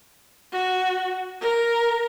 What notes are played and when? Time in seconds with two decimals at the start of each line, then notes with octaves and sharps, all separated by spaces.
0.52 F#4
1.41 A#4